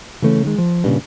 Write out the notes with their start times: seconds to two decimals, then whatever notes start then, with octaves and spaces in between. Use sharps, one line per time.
0.22 C#3 E3 A3 C#4
0.44 D#3 G#3
0.58 F3
0.84 G2 A#2 C#3